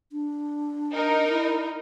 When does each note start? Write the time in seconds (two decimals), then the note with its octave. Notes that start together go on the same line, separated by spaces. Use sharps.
0.12 D4
0.94 D#4 A#4
1.29 E4